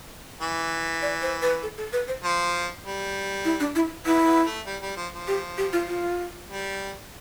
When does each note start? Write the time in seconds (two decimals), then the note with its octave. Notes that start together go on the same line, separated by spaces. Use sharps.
0.41 E3
1.02 D5
1.22 C5
1.42 B4
1.63 A4
1.77 A4
1.93 B4
2.08 C5
2.24 F3
2.84 G3
3.45 E4
3.60 D4
3.75 E4
4.05 B3 E4
4.26 B3
4.46 A3
4.66 G3
4.82 G3
4.96 F3
5.12 F3
5.27 G4
5.58 G4
5.73 F4
5.88 F4
6.49 G3